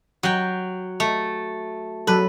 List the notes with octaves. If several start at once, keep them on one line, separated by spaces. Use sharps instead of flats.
F#3 G5
A3
F#3 A4 B4